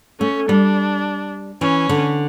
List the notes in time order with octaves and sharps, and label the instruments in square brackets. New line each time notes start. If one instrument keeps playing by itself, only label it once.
[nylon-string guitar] A3 [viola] C#4
[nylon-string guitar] G3 [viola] D4
[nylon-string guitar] E3 [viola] C#4
[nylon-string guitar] D3